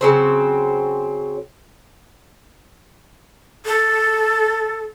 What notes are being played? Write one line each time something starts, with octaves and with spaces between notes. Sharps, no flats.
C#3 F#3 C4
A4